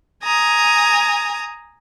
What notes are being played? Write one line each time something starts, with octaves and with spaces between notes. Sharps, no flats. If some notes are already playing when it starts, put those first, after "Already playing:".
G#5 A#5 D#6